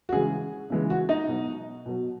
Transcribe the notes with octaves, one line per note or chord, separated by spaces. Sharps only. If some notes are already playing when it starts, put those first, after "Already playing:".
F#4
C#3 E3 G#3 G#4
C#3 E3 G#3
F#4
D#4 D#5
B2 F#3
B2 F#3